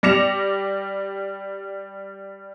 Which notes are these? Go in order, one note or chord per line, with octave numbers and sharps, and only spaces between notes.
G3 D6 A#6 C#7 E7 F7